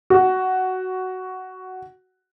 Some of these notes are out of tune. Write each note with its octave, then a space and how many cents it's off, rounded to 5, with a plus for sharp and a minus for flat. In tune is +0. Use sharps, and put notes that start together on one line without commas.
F#4 +10